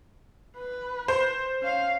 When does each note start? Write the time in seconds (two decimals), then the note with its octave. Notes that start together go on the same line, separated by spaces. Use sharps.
0.57 B4
1.08 C5
1.61 C#4 F5